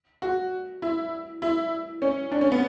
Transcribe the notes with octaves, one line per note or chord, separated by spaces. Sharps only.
F#4
E4
E4
C#4
D4
C#4
B3